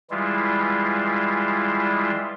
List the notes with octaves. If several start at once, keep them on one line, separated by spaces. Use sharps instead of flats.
E3 G3 G#3 E4 F4